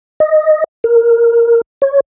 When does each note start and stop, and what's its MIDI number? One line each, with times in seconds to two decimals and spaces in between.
0.20 0.64 75
0.84 1.61 70
1.82 2.00 73